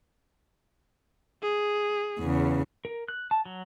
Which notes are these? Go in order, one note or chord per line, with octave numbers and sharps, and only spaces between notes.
G#4
E2 C#3
A#4
F#6
A5
F#3